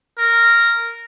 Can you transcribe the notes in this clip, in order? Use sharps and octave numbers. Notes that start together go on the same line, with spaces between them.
A#4